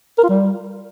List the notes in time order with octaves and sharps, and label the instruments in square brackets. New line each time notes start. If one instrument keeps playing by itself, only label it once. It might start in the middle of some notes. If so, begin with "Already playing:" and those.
[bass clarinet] A#4
F4
G3